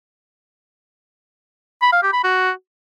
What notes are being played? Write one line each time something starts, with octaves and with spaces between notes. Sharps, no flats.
B5
F5
G4
B5
F#4